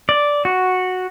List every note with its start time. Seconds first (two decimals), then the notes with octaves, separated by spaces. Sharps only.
0.09 D5
0.45 F#4